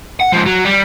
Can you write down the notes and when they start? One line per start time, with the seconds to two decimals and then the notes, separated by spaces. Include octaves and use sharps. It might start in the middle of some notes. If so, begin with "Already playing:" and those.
0.20 F#5
0.33 G#2 F3
0.46 F#3
0.65 G3